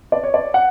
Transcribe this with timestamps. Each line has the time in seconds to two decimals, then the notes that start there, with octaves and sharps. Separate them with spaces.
0.12 D5
0.23 C#5
0.34 D5
0.54 F#5